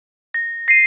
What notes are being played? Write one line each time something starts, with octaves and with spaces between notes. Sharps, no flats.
A#6
A#6 C7 D#7